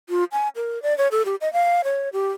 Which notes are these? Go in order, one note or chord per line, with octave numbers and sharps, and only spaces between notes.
F4
G#5
A#4
D5
C#5
A4
G4
D#5
F5
C#5
G4